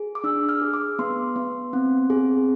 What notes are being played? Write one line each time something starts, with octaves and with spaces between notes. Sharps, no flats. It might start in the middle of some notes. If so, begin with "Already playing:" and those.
Already playing: G#4
D6
D4 E6
F6
G#4
D6
B3 C6
B3
C4
G#4